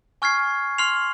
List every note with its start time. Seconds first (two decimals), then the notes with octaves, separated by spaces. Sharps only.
0.22 G#5 C#6 F6 G#6 C7
0.78 C6 F6 C7 F7